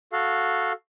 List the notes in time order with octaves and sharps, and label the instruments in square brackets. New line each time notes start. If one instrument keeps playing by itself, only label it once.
[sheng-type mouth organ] F#4 A4 F5